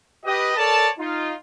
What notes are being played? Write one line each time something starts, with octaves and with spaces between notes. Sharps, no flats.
G4 B4 D#5
A4 A#4 C#5 D5 A5
D#4 F4